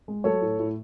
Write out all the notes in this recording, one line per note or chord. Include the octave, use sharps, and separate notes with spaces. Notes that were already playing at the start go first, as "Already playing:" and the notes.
G#3
F#3 A4 C#5
A2
A2